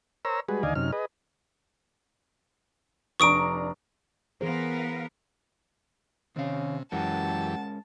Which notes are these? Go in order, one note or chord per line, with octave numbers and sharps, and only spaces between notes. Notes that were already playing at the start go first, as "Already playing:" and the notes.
A#4 C5 C#5 A#5 E6
G3 G#3 F#4 G#4 B4
D2 D#3 D5 D#5 F5 G#5
F#2 C3 C#4 D#4 F6
G#4 B4 D#5
F1 D4 A#5 C#6 D#6 D7
E3 B3 G#4 A#4 C5 F5
C3 D#3 C#4 F5
F#2 E3 G#3 C#4 G4 A#4 F#5 A5